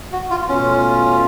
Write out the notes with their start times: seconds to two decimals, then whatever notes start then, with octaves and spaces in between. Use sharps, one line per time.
0.12 F#4
0.30 F4
0.49 B2 A3 C#4 F4